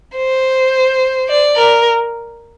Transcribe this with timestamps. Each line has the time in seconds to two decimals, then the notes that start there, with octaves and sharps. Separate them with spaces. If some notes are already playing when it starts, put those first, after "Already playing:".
0.16 C5
1.28 D5
1.56 A#4